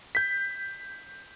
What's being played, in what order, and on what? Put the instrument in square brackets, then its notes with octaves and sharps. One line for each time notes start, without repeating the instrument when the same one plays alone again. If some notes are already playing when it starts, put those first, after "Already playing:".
[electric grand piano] G6 B6